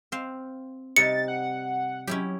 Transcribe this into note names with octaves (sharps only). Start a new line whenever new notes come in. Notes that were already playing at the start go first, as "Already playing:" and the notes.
C4 F5
C3 G3 D#4 A6 C#7
F#5
F#3 C#4 E4 G4